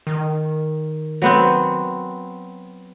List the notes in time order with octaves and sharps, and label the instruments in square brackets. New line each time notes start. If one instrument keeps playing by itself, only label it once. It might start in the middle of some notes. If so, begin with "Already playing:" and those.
[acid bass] D#3
[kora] F#3 B3 C4